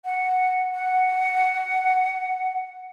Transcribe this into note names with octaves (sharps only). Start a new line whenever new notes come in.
F#5
F#5